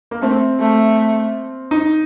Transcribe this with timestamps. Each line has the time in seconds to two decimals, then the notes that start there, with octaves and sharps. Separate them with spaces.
0.11 A#3
0.22 A3 C4
0.60 A3
1.71 D#4